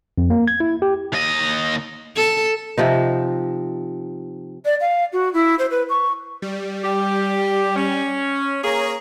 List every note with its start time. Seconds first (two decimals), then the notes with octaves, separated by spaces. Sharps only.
0.18 F2
0.30 A#3
0.48 G#6
0.60 E4
0.82 G4
1.12 D#2 D#5
2.16 A4
2.78 C3 F3 D#4
4.65 D5
4.81 F5
5.13 F#4
5.33 E4
5.59 C5
5.71 B4
5.89 C#6
6.42 G3
6.84 G4
7.76 C#4
8.63 A#3 G#4 C#5 A#5